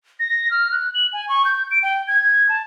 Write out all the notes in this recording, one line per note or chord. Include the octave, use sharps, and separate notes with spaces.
A#6
F6
F#6
F#7
G#5
C#6
G6
D7
G5
G#6
A5